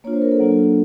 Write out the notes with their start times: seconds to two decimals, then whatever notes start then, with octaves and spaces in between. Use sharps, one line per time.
0.04 A#3 D4 F4 C#5
0.13 C5
0.22 A#4
0.31 A4
0.39 F#3 A#3 D4 F4